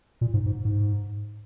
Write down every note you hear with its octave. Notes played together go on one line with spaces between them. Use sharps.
A#2
G#2
G#2
G#2